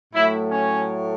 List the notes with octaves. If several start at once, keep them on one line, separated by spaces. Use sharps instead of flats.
A2 F#3 A3 E4
C#4